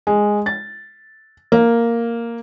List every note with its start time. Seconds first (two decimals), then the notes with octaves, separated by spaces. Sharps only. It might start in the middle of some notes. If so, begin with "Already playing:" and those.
0.07 G#3
0.46 A6
1.52 A#3